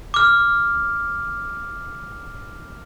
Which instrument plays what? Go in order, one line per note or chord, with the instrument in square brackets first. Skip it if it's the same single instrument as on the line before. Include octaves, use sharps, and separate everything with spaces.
[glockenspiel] D6 F6